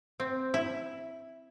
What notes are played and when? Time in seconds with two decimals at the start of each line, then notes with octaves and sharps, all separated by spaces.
0.20 C4
0.54 E4